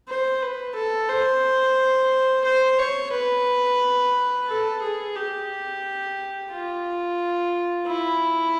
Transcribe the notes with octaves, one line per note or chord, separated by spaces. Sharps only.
C5
B4
A4
C5
C5
C#5
B4
A4
G#4
G4
F4
E4